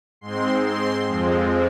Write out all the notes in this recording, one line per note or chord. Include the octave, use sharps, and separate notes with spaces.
G#2 G#3 C4 C6
C6
F2 F3 G#3 C4